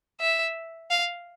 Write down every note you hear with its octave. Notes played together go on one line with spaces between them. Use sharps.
E5
F5